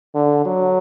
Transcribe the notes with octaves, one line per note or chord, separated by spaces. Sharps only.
D3
F#3